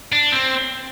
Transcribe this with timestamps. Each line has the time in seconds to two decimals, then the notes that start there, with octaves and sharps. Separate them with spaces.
0.13 D4
0.33 C4